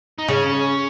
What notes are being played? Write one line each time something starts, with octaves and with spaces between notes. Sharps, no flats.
D#4
C#3 C#4